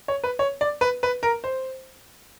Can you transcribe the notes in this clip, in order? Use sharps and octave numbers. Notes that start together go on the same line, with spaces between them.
C#5
B4
C#5
D5
B4
B4
A#4
C5